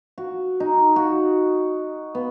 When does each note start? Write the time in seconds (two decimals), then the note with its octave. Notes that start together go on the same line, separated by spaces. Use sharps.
0.18 F#4
0.60 D#4
0.96 F#4
2.15 B3